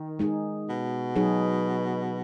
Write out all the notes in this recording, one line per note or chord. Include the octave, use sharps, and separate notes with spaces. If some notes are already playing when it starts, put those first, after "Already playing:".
Already playing: D#3
G#3 D#4 G#4
B2
F#3 D#4 G#4